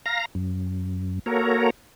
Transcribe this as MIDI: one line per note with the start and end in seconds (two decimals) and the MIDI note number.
0.06 0.25 77
0.06 0.25 82
0.06 0.25 94
0.35 1.19 42
1.26 1.70 58
1.26 1.70 66
1.26 1.70 69
1.26 1.70 70
1.26 1.70 73
1.26 1.70 82